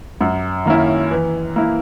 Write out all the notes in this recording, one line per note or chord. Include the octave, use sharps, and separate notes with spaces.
F#2
D#3 A#3 C#4 E4
E3
A#3 E4